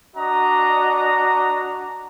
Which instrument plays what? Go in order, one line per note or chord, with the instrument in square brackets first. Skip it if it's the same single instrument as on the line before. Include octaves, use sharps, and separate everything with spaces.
[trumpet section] D4 F#4 D#5 A#5